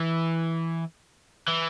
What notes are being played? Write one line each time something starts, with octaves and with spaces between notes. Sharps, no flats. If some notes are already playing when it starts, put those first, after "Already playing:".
Already playing: E3
E3